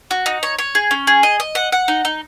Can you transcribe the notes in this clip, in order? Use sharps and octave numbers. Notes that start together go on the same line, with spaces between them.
F#4
D#4
C#5
C#5
G#4
C#4
G#4
D#5
D#5
F#5
F#5
D#4
D#4